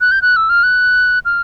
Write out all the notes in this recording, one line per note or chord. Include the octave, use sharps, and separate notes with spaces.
F#6
G6
F#6
E6
F6
F#6
F6